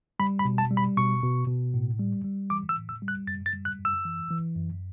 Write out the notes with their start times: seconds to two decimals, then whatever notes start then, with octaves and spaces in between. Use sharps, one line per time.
0.19 G3 B5
0.39 B5
0.45 B2
0.58 A5
0.71 G3
0.77 B5
0.97 B2 C#6
1.23 B2
1.47 B2
1.74 A2
1.99 G3
2.24 G3
2.50 E3 D6
2.69 E6
2.76 A2
2.89 E6
3.02 G3
3.08 F#6
3.27 F#2 A6
3.46 A6
3.53 G3
3.65 F#6
3.79 F#2
3.85 E6
4.05 E3
4.30 E3
4.56 F#2